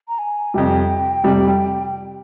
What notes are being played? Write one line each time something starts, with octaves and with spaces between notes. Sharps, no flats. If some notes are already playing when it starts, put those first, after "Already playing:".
A#5
G#5
F2 C3 G3 G5
F2 C3 G3